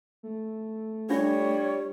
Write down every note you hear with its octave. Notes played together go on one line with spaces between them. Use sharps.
A3
G3 D4 F4 C#5